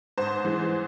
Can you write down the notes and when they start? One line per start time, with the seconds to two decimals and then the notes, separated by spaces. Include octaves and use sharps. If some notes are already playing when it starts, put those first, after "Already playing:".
0.17 G#2 C5
0.45 E3 G#3